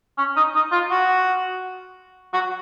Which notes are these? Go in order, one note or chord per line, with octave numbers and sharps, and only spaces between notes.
C#4
D#4
D#4
F4
F#4
F#4